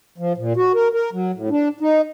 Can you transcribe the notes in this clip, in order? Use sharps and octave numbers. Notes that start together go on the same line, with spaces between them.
F3
A#2
F#4
A#4
A#4
F#3
A2
D4
D#4